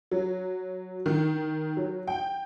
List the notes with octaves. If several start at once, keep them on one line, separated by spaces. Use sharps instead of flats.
F#3
D#3
F#3
G5